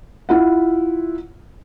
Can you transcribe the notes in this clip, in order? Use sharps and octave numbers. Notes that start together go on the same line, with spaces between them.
E4 F4 F#5